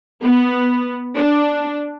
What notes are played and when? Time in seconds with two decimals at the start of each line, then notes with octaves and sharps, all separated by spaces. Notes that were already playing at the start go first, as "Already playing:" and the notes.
0.23 B3
1.16 D4